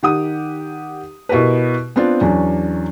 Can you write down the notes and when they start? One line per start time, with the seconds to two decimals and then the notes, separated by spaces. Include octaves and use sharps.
0.03 D#3 G4 F#5 D#6
1.29 B2 E4 F#4 G4 A#4 B4
1.96 B3 C4 D4 F4 C5
2.21 E2 F#3 C#4 D4